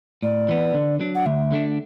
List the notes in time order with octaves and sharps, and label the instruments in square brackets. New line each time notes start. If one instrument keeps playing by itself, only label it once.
[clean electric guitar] A2 [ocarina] D5
[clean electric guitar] E3 B3
D3
F#3 D4
[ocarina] F#5
[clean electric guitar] D2 [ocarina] E5
[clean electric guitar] D3 A3 D4